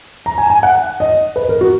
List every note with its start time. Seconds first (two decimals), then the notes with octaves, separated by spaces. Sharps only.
0.26 A#5
0.38 G#5
0.50 G#5
0.63 F#5
1.00 D#5
1.36 B4
1.49 A#4
1.61 F#4